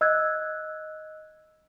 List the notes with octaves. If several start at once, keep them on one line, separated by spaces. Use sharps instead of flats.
D#5 E6 F#6 G#6